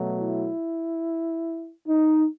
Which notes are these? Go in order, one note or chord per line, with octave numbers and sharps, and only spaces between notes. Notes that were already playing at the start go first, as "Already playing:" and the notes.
Already playing: B2 F#3 A3
E4
D#4